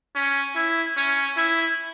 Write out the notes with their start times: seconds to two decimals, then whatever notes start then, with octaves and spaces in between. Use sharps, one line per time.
0.15 C#4
0.55 E4
0.97 C#4
1.37 E4